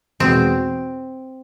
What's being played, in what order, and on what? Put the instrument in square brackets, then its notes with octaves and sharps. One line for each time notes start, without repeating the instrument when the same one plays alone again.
[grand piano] E2 B2 G#3 [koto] C4